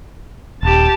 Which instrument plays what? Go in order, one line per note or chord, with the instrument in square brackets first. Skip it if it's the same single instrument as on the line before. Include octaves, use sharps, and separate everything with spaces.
[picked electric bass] D#1 [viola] G4 A5